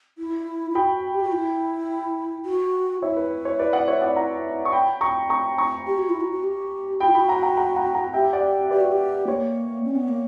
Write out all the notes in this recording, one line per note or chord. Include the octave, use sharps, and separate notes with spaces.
E4
E4
F#4 G5 B5
G4
F#4
E4
F#4
E4 C#5 E5
B4
C#5
B4 D5
D5 F#5
C#5 E5
D5 F#5
F#5 A#5
C#6
G5 B5
A#5 C#6
A#5 C#6
A#5 C#6
G4
F#4
E4
F#4
F#4
G4
F#4 G5 B5
E4
F#4 G5 B5
F#5 A#5
F#5 A#5
F#5 A#5
F#5 A#5
F#5 A#5
G4 E5 G5
D5 F#5
G4 B4 D5
F#4
G4
A#3 C#5
C#4
B3
A#3